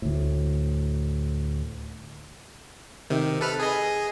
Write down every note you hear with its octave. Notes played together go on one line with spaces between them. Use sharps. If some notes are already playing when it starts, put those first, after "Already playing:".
D2 A2
C3 D#3
A4 B4 F6
G#4 D#5